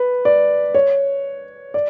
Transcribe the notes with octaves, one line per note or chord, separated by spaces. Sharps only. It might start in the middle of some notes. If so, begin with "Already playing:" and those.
Already playing: B4
D5
C#5
D5